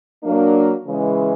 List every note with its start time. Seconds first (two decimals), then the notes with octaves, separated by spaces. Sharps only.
0.22 F#3 A#3 D4
0.86 C#3 E3 G#3